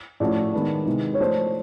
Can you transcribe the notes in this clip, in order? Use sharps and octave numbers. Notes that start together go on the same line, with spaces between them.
A2 F3 A3 C#4 F#4 D5
D#3 G#3 B3 D4
C3 D#3 G#3 B3 E4
C#5
F3 A3 D4 C5